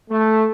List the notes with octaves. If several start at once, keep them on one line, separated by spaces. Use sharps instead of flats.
A3